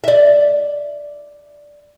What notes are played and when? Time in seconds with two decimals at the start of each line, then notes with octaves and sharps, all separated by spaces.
0.04 D5 E5